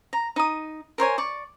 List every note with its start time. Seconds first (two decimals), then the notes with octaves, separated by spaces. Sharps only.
0.13 A#5
0.36 D#4 D#6
0.98 A#4 C5 C#5 G#5
1.18 D5 C#6